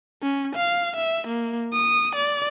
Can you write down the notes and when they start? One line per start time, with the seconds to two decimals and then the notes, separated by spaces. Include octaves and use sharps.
0.23 C#4
0.56 F5
0.96 E5
1.28 A#3
1.73 D#6
2.16 D5